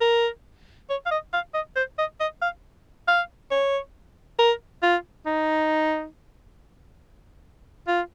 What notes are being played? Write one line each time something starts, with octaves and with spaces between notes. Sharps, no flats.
A#4
C#5
F5
D#5
F5
D#5
C5
D#5
D#5
F5
F5
C#5
A#4
F4
D#4
F4